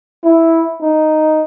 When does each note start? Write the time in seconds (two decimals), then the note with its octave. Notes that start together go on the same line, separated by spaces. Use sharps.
0.25 E4
0.82 D#4